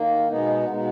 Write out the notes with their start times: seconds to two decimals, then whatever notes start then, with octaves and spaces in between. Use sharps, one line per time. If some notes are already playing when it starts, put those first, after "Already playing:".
Already playing: D#3 A#3
0.28 B2 G#3 B3 D#4
0.68 B2 G#3 B3 D#4